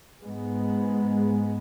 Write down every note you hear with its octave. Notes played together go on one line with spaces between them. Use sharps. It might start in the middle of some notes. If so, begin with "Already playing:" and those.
G#2 G#3 B3